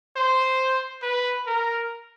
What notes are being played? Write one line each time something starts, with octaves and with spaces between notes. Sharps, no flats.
C5
B4
A#4